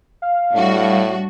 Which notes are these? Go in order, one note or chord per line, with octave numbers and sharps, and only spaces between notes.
F5
A2 G3 D4 F#4